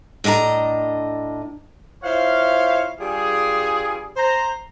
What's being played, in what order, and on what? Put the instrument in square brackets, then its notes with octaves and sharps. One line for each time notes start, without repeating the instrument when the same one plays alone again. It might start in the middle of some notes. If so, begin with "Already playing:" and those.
[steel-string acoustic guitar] A2 D4 D#5 A5 A#5
[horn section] E4 F4 C5 C#5 F5
G2 G3 F4 G#4
C5 A#5